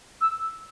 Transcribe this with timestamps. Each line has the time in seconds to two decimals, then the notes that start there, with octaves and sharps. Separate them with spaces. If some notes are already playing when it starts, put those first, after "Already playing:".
0.20 E6